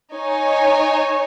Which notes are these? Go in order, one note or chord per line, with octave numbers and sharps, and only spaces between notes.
D#4 C#5 G#5